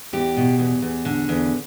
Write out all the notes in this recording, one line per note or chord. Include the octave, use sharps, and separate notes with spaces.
E2 G4
B2
E2
E2
D3
E2